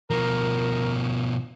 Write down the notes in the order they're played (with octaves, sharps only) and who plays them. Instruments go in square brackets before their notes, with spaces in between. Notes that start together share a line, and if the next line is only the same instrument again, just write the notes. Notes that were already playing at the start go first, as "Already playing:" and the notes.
[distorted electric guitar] B2 F3 [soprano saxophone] A#4